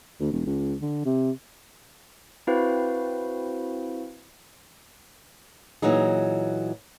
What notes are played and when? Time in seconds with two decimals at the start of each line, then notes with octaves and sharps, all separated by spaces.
0.20 D2
0.32 E1
0.46 C#2
0.81 D3
1.05 C3
2.47 C4 E4 F#4 B4 C5 F5
5.82 A#2 E3 F#3 D#4 G#4